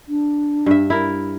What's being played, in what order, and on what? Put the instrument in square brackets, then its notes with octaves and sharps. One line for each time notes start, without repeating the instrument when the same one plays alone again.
[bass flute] D4
[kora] G2 E5
E4 A#4